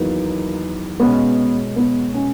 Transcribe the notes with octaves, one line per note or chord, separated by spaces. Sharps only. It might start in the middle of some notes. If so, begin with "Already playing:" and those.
Already playing: E2 D#3 F#3 A#3 B3 D#4
B2 G#3 B3 C#4
B3
C#4